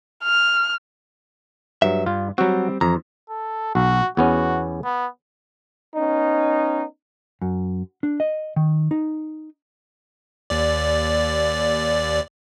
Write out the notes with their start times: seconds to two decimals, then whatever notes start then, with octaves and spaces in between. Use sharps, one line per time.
0.24 F6
1.82 G2 F#3 E5
2.06 G2 F4
2.38 F#3 G3 C4 F#4
2.81 F2 E3 A#5
3.29 A4
3.75 B1 F#4
4.17 E2 B3 C#4 F#4
4.84 B3
5.95 B3 C#4 D#4
7.41 F#2
8.03 D4
8.20 D#5
8.56 D#3
8.91 D#4
10.50 D#2 D5